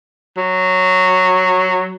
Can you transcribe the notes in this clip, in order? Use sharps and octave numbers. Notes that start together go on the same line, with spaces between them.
F#3